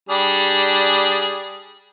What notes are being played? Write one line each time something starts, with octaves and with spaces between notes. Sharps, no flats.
G3 D4 G#4